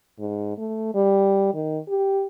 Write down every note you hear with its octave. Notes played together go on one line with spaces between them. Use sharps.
G#2
A3
G3
D#3
G4